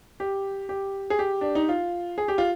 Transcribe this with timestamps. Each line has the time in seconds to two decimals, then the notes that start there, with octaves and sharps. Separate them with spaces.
0.20 G4
0.69 G4
1.10 G#4
1.19 G4
1.41 D4
1.55 D#4
1.69 F4
2.18 G#4
2.28 G4
2.38 F4